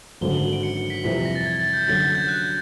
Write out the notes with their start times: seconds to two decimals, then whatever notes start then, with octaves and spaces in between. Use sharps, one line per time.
0.21 G#1 F#2 D3 F#3 G7
0.31 F#7
0.42 F#7
0.53 D7
0.63 C#7
0.77 C#7
0.90 B6
1.04 F2 C3 E3 G3 B6
1.14 B6
1.25 A#6
1.35 A6
1.46 G#6
1.59 A6
1.73 G6
1.87 F#2 D3 F#3 A6
2.01 G#6
2.15 G6
2.28 F#6